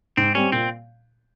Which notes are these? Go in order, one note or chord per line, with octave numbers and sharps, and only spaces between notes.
G#2 C4
G3 C4 C#4
A#2 C4